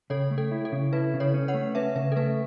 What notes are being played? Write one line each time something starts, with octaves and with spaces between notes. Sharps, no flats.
C#3 A4 C#5
A3
A4
E4
A4
C#3
E4 B4
C#3
A4 C#5
C#4
C#5 F#5
A3
C#4 B4 E5
C#3 B4
A4
A3 B4